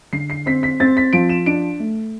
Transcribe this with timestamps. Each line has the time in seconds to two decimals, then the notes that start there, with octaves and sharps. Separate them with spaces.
0.13 D3 C7
0.30 C7
0.46 C4 B6
0.63 B6
0.80 C4 A6
0.97 B6
1.13 F3 D7
1.29 E7
1.46 D4 D7
1.79 A3